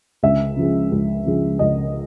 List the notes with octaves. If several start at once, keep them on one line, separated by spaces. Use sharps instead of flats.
C#2 E5
C#3 F3 G#3
C#2
C#3 F3 G#3
C#2 D#5